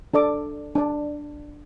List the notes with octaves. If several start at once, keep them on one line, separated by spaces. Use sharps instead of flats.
D4 A4 D5 D6
D4 D5